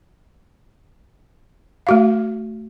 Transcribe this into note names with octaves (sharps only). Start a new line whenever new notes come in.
A3 F#4 F5